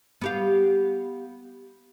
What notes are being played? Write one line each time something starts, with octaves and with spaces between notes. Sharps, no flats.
B3 G4 F5